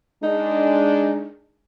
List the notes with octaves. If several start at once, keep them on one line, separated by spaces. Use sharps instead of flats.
G#3 D4 D#4